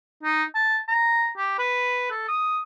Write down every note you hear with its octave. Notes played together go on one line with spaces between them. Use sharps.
D#4
A5
A#5
G4
B4
A4
D#6